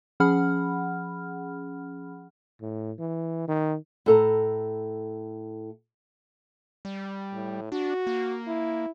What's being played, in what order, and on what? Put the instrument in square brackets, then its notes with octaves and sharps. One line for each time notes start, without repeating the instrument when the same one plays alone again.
[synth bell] F3 C#4 G#4 F#5 B5 F6
[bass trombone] A2
E3
D#3
[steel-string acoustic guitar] A2 A4 A#5
[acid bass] G3
[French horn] A2
[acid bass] D4 [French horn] F#4
[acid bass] A#3
[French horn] E4